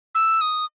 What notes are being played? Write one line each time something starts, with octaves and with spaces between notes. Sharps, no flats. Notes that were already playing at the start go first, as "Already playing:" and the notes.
E6
D#6